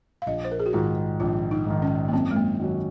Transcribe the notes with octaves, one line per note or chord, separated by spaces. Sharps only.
F5
A#1 D#5
C5
A#4
G#4
F#4
G#2 D#3 F4
A#1 F4
D#4
G#2 D#3
C#4
A#3
F#2 C4
G#3
A#3
D#3 F#3 C#4 F#4